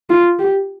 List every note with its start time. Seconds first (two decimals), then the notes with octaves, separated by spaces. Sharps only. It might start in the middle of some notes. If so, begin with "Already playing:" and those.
0.10 F4
0.39 G4